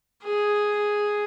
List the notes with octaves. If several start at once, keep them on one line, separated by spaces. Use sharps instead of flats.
G#4